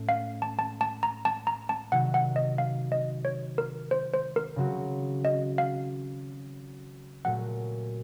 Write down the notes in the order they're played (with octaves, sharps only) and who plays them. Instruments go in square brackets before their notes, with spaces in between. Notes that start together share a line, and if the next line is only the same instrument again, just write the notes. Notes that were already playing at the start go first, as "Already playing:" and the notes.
Already playing: [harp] A2 A3 C#4
[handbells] F5
A5
A5
A5
A#5
A5
A#5
A5
[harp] C3 D#3 F#3 [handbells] F#5
[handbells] F#5
D#5
F5
D#5
C#5
A#4
C5
C5
A#4
[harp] C#3 F#3 C4 F#4
[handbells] D#5
F5
[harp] A#2 F#3 A3 [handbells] F#5